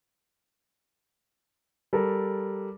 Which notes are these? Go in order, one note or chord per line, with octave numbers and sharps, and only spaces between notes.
G3 A4 A#4